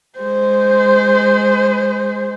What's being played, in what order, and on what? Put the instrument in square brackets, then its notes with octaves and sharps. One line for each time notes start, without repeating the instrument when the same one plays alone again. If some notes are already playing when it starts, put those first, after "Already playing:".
[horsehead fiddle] G#3 C5